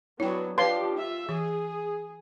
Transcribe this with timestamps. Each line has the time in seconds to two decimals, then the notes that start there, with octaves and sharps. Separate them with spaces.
0.20 F#3 B3 D4 E4 C#5 G5
0.58 F3 D4 G4 B4 C#5 F5 C6
0.96 F4 E5
1.29 E3 G#4